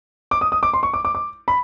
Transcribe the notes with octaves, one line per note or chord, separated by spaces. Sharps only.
D6
D#6
D#6
D6
C6
C#6
D6
D6
D6
B5